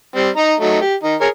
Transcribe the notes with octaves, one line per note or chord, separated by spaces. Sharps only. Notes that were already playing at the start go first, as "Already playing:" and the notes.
G3 C4
D#4 A#5
F#3 A3 D#4
G4
D#3 D#4
G#4 A#4 C#5